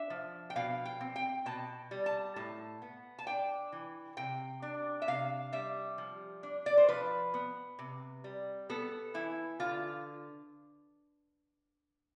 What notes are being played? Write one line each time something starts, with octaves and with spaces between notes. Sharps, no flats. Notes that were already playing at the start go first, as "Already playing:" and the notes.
Already playing: D4 E5
F3
G5
B2 F5
G5
C4
G5
B2 A5
G3
A5
A2 A5
B3
A5
D4 G5
E3
C3 G5
D4
E5
C3 F5
G3 E5
F3
D4
D5
C5
F3 B4
B3
C3
G3
B3 A4
E3 E4
D3 F4